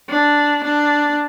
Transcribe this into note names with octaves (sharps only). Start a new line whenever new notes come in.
D4
D4